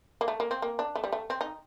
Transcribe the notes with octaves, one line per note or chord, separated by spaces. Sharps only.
A#3
A3
A#3
C4
A#3
D4
A3
G3
A3
C4
D#4